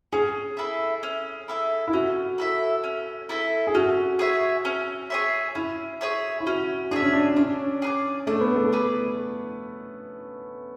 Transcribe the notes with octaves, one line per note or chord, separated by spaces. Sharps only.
C#4 G#4
E4 A4 E5
C#4
E4 A4 E5
E4
C#4 F#4
E4 A4 E5
C#4
E4 A4 E5
G#4
C#4 F#4
G#4 C#5 E5
C#4
G#4 C#5 E5
C#4 E4
G#4 C#5 E5
E4
C#4 F#4
D4 G#4 C#5 E5
C#4
D4
C#4 D4
G#4 B4 D5
A3 D4
B3
A3
G#4 B4 D5